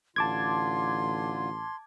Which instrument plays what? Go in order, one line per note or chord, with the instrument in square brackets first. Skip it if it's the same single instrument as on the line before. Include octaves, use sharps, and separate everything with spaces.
[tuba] A1 [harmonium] D3 F4 [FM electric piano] A5 D6 G#6 [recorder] C6